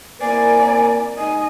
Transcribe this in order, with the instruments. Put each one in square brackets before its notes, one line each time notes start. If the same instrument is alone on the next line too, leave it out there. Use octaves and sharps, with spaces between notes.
[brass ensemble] A#3 C4 A#4 [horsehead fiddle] E4 D5 [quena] G#5
[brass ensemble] G#3 D#4 [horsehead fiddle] D#5 [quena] G#5